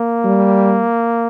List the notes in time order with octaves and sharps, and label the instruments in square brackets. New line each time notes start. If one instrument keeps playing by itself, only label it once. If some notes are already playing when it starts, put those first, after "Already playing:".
Already playing: [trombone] A#3
[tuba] G3